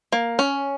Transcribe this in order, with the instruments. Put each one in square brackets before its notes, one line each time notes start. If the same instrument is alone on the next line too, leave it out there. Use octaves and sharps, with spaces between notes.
[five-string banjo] A#3
C#4